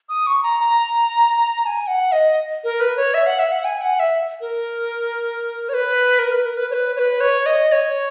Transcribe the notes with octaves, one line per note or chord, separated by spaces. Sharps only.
D#6
C#6
A#5
A#5
A#5
G#5
F#5
D#5
A#4
B4
C#5
E5
F#5
E5
F#5
G#5
F#5
E5
A#4
C#5
B4
A#4
B4
A#4
B4
C#5
B4
C#5
B4
C#5
D#5
C#5